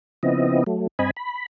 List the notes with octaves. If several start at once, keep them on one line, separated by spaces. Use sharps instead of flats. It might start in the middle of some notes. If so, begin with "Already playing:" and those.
C#3 F3 B3 C4 E4 D#5
F#3 A3
G2 C4 D#5 G#5 B5
B5